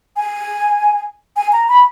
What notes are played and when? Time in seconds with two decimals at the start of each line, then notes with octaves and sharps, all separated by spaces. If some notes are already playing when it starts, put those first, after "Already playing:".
0.16 G#5
1.36 G#5
1.53 A#5
1.68 B5